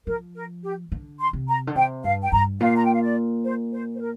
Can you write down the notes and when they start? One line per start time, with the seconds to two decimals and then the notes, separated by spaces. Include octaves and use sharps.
0.07 F3 A#4
0.35 A#4
0.63 G4
0.92 D3
1.19 C6
1.33 C3
1.48 A#5
1.67 D3
1.75 C3 G5
2.04 G2 F5
2.23 G5
2.32 G2 A#5
2.60 A#2 F5
2.76 A#5
2.85 G5
2.93 F5
3.02 D5
3.44 C5
3.73 C5
3.95 C5
4.01 A#4